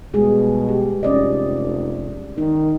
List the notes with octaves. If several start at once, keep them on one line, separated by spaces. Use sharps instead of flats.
B2 G3 G#3 G#4
G4
F1 C#4 D5 D#5
D#3 D#4